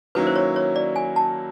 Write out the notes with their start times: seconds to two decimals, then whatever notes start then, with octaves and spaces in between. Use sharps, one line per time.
0.15 D#3 F#3 A#3 C#4 E4 B4
0.27 C5
0.36 C#5
0.56 C#5
0.76 D5
0.96 G#5
1.16 A5